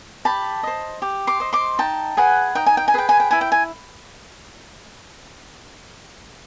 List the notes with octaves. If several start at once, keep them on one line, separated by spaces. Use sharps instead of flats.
G4 A5 B5
C5 D#5
G4
C6 D6
C5 D#5
C6 D6
D#4 G5 A5
G#4 B4 F#5 G#5
D#4 G5
G#5
G5
G#5
G#4 B4 G5
G#5
G5
E4 G#5
G5
G#5